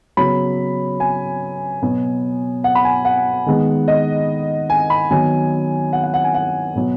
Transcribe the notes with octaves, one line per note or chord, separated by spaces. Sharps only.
C#3 F#3 B3 B5
G#5
B2 F#3 B3
F#5
B5
G#5
F#5
D#3 G#3 B3
D#5
G#5
B5
D#3 F#3 B3 G#5
F#5
F#5
F#5
G#5
F#5
B2 F#3 B3